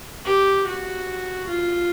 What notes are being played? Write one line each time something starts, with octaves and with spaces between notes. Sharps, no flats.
G4
F#4
F4